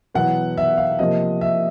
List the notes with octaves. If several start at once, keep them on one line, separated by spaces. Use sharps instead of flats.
E2 B2 F#3 B3 F#5
E5
F5
C3 F3 A#3 D#5
E5